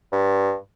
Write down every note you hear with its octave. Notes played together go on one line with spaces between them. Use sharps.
G2